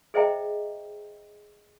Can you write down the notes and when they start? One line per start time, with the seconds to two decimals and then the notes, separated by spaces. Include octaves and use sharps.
0.14 G#4 C5 D#5 E5 G5 A#5